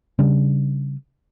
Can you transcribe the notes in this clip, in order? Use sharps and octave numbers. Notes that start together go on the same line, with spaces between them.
C#3 G3 D4